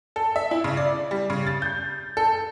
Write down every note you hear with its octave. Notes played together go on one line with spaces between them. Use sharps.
A4
E5
E4
C#3
D5
G3
C#3
A6
G6
A4